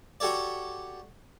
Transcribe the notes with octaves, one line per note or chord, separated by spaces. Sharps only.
F#4 G4 A4 C#5 D5